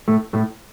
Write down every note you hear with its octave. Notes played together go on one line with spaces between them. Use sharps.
A2 A3
A2 A3